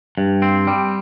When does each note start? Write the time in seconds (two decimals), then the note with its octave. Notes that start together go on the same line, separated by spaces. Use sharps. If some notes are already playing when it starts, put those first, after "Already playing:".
0.18 G2
0.42 C4
0.67 G3